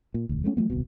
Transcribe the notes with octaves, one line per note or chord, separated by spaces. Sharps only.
A#2
E1 D2
G#3 A3 B3 C#4
F3 F#3 A3 B3
D#1 C2 B2